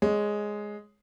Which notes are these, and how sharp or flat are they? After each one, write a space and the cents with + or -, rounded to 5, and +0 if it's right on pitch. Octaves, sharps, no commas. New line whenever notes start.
G#3 +0 C#5 +0